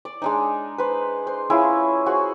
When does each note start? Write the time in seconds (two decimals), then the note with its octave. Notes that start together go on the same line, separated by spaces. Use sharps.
0.05 D5
0.22 G#3 D4 D#4
0.78 B4 C5
1.27 C5
1.50 C#4 E4 F4 G#4
2.06 F#4 G#4 C5